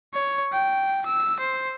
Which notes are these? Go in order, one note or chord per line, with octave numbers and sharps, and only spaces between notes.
C#5
G5
E6
C5